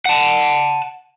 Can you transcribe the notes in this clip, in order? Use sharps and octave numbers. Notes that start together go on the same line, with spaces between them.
F#5 A5